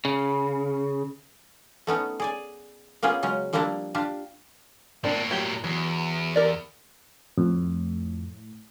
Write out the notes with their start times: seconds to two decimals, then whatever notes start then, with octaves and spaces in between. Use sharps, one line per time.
0.05 C#3
1.87 A3 B3 C#4 D#4
2.20 G#4 D5 G#5
3.03 A#3 B3 C#4 F4 G#4
3.23 C#3 F#3 G#3 C#4
3.53 F3 G3 A#3 C4 D4 E4
3.95 D4 F4 G4
5.04 A2 A#3 C4 D4 A#4
5.31 F#3 G4
5.64 E2 F#3
6.36 G4 A#4 D5
7.38 F2 A2